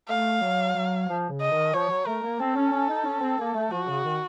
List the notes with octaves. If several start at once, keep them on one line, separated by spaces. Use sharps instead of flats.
A3 F5
F#3
F#3
F3
C#3
D#5
D#3
F3 C#5
F#3
A3 A#4
A#3
C4 A4
C#4
C#4
D#4
C#4
C4
A#3
A3
F3 F#4
C#3
D#3